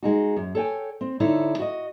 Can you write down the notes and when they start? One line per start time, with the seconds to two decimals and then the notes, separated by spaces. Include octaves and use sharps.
0.03 G#3 D#4 F#4
0.37 F#2
0.55 A4 C#5 G5 G#5
1.01 C4
1.20 D3 D#4 E4 C#5
1.59 F#4 D#5